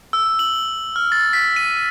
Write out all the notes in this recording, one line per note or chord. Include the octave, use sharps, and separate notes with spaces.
E6
F#7
F6
A6
B6
D#7